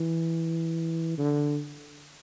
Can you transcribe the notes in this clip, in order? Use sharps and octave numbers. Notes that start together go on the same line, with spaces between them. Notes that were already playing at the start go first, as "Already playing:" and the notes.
Already playing: E3
D3